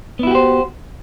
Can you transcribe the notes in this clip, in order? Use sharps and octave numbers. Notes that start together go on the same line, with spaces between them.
B3 E4 F#4 G4 C5